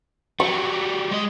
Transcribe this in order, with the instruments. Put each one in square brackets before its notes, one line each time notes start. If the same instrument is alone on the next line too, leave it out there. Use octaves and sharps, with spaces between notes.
[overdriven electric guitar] F#3 G3 [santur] C#6
[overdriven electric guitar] G#3 D#5